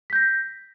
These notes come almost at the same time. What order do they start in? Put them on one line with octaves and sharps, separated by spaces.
B6 G6 A#6